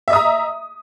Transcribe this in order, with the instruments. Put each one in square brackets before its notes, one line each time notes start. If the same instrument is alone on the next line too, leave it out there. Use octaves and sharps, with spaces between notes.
[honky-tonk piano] E5
D#5
D#6
A#5